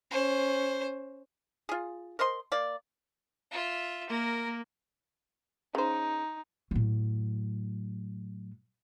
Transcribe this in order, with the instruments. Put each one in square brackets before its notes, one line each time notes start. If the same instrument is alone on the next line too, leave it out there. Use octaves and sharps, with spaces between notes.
[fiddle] C#4 C5
[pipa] F4 G#4
A#4 C5 D#5 C6
A#3 D5
[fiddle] F4 E5
[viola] A#3 [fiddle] A#4
[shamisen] C#3 C5 [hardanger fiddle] D#4
[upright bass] A2 F#3